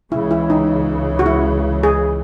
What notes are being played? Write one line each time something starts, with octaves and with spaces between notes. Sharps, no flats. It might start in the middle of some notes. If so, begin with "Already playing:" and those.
C#2 C#3 E3 E4
E4
D#4
F#4
E4
G#4